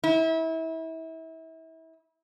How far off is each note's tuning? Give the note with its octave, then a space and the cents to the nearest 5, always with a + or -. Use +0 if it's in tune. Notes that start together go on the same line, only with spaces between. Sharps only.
E4 -30